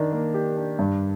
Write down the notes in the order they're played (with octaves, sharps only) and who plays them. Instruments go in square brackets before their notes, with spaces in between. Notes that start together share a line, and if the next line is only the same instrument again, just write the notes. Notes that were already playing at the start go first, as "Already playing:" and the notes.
Already playing: [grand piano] D#3 D4
A#3
G4
D4
G2